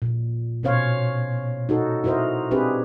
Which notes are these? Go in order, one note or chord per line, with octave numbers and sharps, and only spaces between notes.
A#2
B2 C#4 C5 C#5 F5
D#4 F#4 A4
E4 F#4 A#4 C5 D#5
C4 D4 G4 G#4 B4 C5